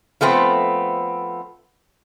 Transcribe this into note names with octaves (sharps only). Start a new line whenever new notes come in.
F3 A3 B3 C4